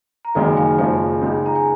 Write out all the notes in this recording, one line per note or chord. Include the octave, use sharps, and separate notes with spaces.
A#5
F#1 F#2 D#3 G#3 F5 G#5
F5 G#5
F#1 F#2 F3 G#3 C#4 F5 G#5
C#2 C#3 G#3 D#4
A#5
G#5